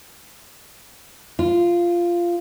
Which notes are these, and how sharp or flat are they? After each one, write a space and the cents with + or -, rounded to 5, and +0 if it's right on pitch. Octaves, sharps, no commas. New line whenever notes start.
F4 -10